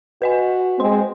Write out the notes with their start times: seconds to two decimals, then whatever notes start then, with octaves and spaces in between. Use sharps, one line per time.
0.22 F#4 B4 D#5 G#5
0.80 G#3 C4 C6